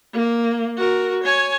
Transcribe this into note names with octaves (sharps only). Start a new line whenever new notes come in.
A#3
F#4 A#4
C#5 G#5